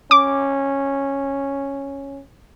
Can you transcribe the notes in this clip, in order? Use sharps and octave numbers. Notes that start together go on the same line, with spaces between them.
C#4 D6